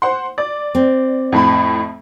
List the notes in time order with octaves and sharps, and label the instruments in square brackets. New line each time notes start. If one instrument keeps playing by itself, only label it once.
[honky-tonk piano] C5 F#5 C6
D5
[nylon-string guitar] C4
[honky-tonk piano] F2 A2 B5